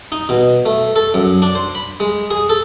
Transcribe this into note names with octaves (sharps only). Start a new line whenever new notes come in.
D#4
B2
A3
A4
F#2
D4
C5
B5
G#3
G#4
A4